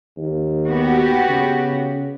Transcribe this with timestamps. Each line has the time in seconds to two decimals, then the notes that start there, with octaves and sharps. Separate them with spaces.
0.17 D#2
0.68 B3 F#4 G4
1.29 C#3